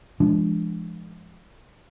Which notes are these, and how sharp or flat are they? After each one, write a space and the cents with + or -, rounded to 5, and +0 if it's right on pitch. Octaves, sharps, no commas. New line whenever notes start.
F3 -40 G#3 +0 D4 +0